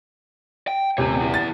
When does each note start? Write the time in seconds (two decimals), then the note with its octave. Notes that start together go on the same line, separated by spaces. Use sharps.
0.68 G5
0.98 D#1 A2 C3 C#5
1.17 B3 E4
1.34 A6